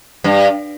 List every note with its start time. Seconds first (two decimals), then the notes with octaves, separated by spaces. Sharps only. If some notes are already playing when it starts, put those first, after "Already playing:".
0.24 G2